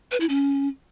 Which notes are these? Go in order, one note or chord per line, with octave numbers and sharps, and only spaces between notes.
B4
E4
C#4